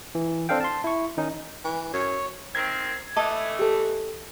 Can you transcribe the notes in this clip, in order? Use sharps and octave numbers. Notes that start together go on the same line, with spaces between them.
E3
C4 D4 A4 F5 G5
A5 C6
E4 C#6
D#3 C#4 D#4
E3
F#2 C#5
D#3 C4 G#6
E3 A3 D#5 A5 D6
G4 A4